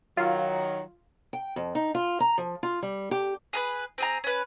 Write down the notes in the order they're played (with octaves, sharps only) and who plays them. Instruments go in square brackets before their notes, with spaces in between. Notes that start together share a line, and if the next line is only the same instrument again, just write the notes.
[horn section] D#3 F#3 [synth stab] F4
[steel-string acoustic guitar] G5
F2
D#4
F4
A#5
F3
F4
G3
G4
[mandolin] G#4 A#4 B4
C4 G#4 A#5
C#4 B4